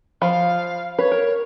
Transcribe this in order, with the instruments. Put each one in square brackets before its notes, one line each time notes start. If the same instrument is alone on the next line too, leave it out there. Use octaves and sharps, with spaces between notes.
[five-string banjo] F3 B5 [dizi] F5
[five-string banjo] B4 [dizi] C#5
[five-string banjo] A#4